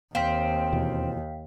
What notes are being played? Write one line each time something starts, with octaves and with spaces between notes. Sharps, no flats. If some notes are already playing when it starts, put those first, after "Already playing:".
D#2 C4 F5 G5 B6
E2 B2